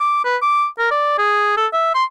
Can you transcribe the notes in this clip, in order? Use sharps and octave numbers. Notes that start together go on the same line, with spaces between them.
D6
B4
D6
A#4
D5
G#4
A4
E5
C6